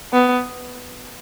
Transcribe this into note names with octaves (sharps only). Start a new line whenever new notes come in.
B3